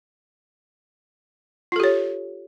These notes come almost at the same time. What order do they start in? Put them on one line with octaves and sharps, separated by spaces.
F4 A4 G4 C#5